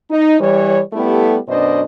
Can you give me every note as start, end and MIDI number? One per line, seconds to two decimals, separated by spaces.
0.11 0.39 63
0.40 0.80 52
0.40 0.80 55
0.40 0.80 73
0.93 1.38 55
0.93 1.38 57
0.93 1.38 59
0.93 1.38 64
0.93 1.38 67
0.93 1.38 69
1.48 1.82 42
1.48 1.82 47
1.48 1.82 62
1.48 1.82 72
1.48 1.82 74
1.48 1.82 75